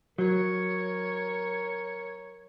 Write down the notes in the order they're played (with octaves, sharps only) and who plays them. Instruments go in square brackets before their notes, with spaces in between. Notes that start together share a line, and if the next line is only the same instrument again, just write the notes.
[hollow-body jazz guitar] F#3 [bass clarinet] A#4 [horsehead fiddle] C#5